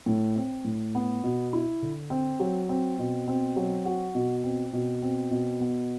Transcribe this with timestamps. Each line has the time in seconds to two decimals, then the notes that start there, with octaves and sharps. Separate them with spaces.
0.06 A2
0.36 C4
0.65 A2
0.95 B3
1.23 B2
1.53 E4
1.82 D3
2.10 C4
2.40 F#3
2.69 C4
2.99 B2
3.28 C4
3.56 F#3
3.85 F#4
4.15 B2
4.44 C4
4.73 B2
5.02 C4
5.31 B2
5.61 B3